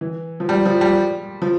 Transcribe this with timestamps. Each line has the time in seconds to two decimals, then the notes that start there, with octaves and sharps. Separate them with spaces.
0.01 E3
0.40 F3
0.49 G3
0.65 F3
0.81 G3
1.42 F3